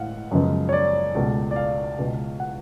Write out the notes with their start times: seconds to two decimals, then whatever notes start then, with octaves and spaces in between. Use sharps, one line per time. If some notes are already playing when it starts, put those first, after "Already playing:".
Already playing: A2 G#3 F5 F#5
0.31 F#2 C#3 F3 G#3 B3
0.69 C#5
0.73 D5
1.15 C#2 B2 A3
1.51 D5
1.56 F5
1.98 C#2 B2 G#3 B3
2.40 F#5